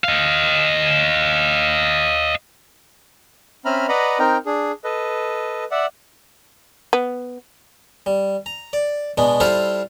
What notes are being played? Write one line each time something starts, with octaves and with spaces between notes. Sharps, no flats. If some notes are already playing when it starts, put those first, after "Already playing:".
D#5 F5
C4 C#4 E5 A#5 B5 F6
B4 D5 D#5 F#5 A#5 B5
C4 D#4 A#4 G5 A#5
D4 G#4
A4 B4 D#5
D5 E5 F#5
B3
G3
A#5
D5
B2 G#3 B3 D4
G3 E4 F4 A4 C5 F5